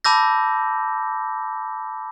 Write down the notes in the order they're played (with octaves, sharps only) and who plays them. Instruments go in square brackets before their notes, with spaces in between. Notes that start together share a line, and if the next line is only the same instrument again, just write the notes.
[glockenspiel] A5 B5 D6 E6 G6 A#6